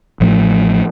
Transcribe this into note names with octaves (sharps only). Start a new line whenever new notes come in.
A1 A2 F3 A3